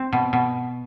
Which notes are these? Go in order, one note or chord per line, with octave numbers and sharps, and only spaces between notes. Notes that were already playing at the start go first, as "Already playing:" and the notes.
Already playing: C4
B2
B2